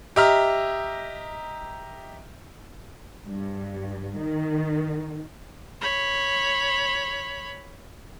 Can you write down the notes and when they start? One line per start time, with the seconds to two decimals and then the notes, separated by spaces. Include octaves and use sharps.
0.16 G4 D#5 E5 A#5 F6
3.26 G2
4.19 D#3
5.81 C#5 B5